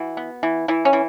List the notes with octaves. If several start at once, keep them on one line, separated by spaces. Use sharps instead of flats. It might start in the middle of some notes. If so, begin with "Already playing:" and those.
Already playing: E3 F#4
B3
E3
E3 E4
C#4
E3